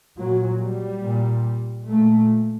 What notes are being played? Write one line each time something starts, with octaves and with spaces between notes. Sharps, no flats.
A#2 F#3
G3
A#2
A#2 A3